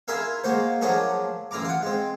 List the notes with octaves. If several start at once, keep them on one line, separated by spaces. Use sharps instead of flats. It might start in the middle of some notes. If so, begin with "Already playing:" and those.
E4 F4 G#4 A#4 E5 F5
G#3 A#3 F#4 C5
F3 F#3 D4 F#4 G#4 A#4
A1 E4 F4 A#5 D6
F4 F#5
G#3 C4